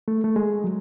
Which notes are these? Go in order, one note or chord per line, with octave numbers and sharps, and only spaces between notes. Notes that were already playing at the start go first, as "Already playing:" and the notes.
A3
A3
G#3
F#3